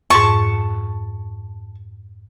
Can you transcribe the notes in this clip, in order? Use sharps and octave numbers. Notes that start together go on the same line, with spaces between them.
F2 G#2 A5 C#6